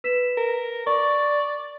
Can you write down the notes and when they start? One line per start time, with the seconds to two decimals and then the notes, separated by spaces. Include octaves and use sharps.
0.04 B4 B6 E7
0.37 A#4
0.86 D5 C#6